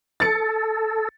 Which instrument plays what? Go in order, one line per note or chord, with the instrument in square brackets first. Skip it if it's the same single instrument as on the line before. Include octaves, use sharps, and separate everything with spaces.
[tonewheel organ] A4 [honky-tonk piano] A6 C#7